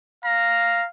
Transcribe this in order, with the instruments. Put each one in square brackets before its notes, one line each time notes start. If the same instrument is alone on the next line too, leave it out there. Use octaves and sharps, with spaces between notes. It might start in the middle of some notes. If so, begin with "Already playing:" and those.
[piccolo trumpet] F5 [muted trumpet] A#5